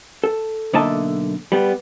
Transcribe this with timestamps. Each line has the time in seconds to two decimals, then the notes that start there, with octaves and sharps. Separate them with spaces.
0.24 A4
0.73 B1 D3 A#3 D#5 E5 A5
1.52 G3 B3